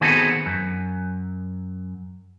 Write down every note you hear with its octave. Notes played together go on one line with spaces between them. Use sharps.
D#3 B3 C4 F#4 G#4 A4
F#2